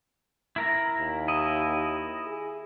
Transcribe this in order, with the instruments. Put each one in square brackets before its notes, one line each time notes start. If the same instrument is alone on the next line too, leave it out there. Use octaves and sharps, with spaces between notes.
[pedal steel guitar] E4 A#4 A#5
[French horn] D#2
[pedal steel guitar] E4 D#5
[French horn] G#4